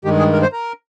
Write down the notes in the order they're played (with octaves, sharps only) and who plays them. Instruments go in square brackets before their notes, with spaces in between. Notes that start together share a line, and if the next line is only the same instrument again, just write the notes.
[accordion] G2 D#3 G#3 G4
G#4
A#4
C5
A#4